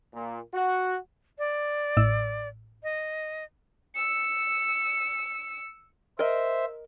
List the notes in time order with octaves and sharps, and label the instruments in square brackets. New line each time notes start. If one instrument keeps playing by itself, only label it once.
[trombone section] A#2
F#4
[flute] D5
[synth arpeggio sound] A1 A2 E6
[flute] D#5
[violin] E6 C#7
[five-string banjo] A#4 D#5 [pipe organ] C5 E5